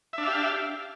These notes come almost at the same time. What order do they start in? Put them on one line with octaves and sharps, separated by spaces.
E5 D4 F5 G4